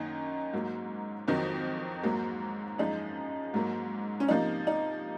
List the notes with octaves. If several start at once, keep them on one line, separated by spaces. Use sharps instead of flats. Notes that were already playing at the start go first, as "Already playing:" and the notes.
Already playing: F#2 D#3 A#3 D#4
G#2 F#3 A#3
F2 D#3 F#3
G#2 F#3 A#3
F#2 F3 G#3 D#4
G#2 F#3 A#3
C#4
C3 F3 A#3 D#4
D#4